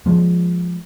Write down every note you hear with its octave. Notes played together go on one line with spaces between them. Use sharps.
F3 G#3